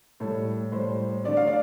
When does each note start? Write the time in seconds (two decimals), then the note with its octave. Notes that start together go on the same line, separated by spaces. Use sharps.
0.20 A2 G3 A4
0.72 A2 G3 C5
1.24 D3 A3 D5
1.37 F5
1.47 D5